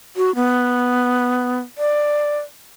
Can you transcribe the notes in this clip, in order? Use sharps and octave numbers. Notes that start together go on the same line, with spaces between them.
F#4
B3
D5